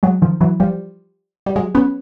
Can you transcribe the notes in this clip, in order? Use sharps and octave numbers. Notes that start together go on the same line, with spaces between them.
F#3 G#3
D#3 F3
E3 F#3
F3 G3
G3
F#3 G#3
B3 C#4